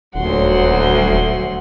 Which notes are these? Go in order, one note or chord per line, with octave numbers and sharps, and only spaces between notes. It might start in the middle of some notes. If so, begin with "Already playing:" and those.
D#1 D2 F#3 F#5 C6